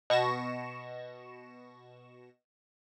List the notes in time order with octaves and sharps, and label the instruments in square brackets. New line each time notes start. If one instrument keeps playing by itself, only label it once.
[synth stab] B2 C#6 A#6 E7